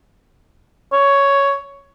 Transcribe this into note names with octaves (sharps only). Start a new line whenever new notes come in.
C#5